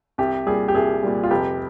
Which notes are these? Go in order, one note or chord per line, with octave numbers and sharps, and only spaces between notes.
C2 G4
A#2 G3 G#4
G4
C2 G#4
A#2 G3
F4
F1 G4